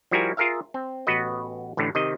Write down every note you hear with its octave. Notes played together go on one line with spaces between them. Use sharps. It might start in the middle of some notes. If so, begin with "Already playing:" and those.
F3 G3 E4 F#4 A#4 G#5
F4 G#4 A#4 E5 F5
C4
A1 B3 F#4 B4 D#5
A1 A2 D3 A3
C3 D#3 D#5